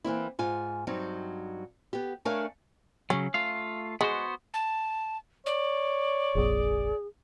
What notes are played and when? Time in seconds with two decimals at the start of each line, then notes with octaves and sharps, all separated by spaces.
0.04 E3 A#3 C4 E4
0.39 G#2 F4 G#5
0.87 G2 F#3 C4 D#4
1.93 B3 G4
2.25 A3 D4 A#4 C#5 F5 G#5
3.10 C#3 F#3 C#4
3.34 A3 F4 F5
4.01 G#3 B3 F#4 C5
4.54 A5
5.46 C#5 D5
6.35 F1 A#1 G#4